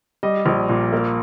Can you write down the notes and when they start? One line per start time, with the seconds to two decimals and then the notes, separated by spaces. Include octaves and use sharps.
0.23 G3 D#5
0.46 A#1
0.69 A#2
0.93 A#3